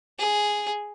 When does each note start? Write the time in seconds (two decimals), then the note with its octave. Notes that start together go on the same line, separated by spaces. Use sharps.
0.19 G#4